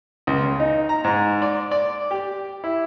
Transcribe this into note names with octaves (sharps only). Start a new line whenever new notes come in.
C#2
C#3
D#4
A#5
G#2
D5
D5
G4
E4